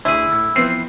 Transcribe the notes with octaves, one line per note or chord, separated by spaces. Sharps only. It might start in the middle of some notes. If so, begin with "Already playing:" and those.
D2 E4 G#4 E6
A2
E3 F3 B3 C4 C7